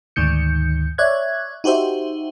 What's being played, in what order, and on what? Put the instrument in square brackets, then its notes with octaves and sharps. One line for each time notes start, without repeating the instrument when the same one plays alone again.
[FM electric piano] D2 G#2 D#3 G6 C#7
C#5 D5 E5 F#6 G#6
D#4 F#4 G4 C5 E5